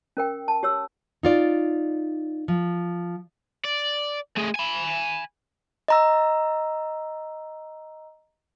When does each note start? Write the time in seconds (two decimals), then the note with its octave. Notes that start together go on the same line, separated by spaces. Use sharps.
0.17 C#4 A#4 G5
0.48 A5
0.63 G4 C#5 E6
1.23 D#4 F4 D5
2.48 F3
3.65 D5
4.37 A3 G#4
4.56 G#5 B5
5.88 D#5 A#5 E6